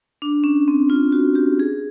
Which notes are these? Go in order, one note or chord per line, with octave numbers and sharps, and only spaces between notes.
D4
C#4
C4
F4
F#4
G4
G#4